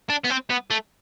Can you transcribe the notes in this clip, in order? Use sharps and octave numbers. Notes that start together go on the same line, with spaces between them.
D4
B3
C4
B3
A3